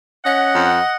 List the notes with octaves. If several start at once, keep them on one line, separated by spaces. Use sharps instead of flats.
C#4 D#5 F#5
F2